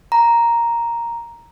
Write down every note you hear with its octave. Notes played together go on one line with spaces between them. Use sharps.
A#5